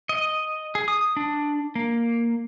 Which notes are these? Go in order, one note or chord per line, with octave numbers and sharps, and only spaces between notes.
D#5
G#4
D#6
D4
A#3